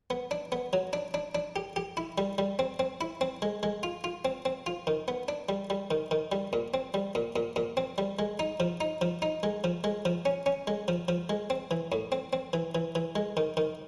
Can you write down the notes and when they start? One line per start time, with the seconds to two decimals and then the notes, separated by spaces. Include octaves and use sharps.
0.10 B3
0.31 D4
0.52 B3
0.73 F#3
0.93 D4
1.14 D4
1.35 D4
1.56 G4
1.76 G4
1.97 E4
2.18 G3
2.38 G3
2.59 C4
2.79 C4
3.01 E4
3.21 C4
3.42 G#3
3.63 G#3
3.83 F4
4.04 F4
4.25 C4
4.45 C4
4.66 F4
4.87 D#3
5.08 B3
5.28 D4
5.49 G3
5.70 G3
5.91 D#3
6.11 D#3
6.32 G3
6.53 A#2
6.74 C4
6.94 G3
7.15 A#2
7.36 A#2
7.56 A#2
7.77 C4
7.98 G3
8.19 G#3
8.39 D#4
8.60 F3
8.81 D#4
9.01 F3
9.22 D#4
9.43 G#3
9.64 F3
9.84 G#3
10.05 F3
10.25 C#4
10.46 C#4
10.67 G#3
10.88 F3
11.08 F3
11.29 G#3
11.50 C4
11.71 E3
11.92 A2
12.12 C4
12.33 C4
12.53 E3
12.75 E3
12.95 E3
13.16 G#3
13.37 D#3
13.57 D#3